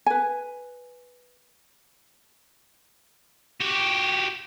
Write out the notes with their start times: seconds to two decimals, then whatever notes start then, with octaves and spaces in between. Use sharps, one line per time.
0.06 B4 G#5
3.60 F#4 G4